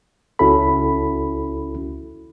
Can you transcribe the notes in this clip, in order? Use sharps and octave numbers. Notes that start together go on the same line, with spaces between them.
C#2 C#4 E4 F#4 A4 B5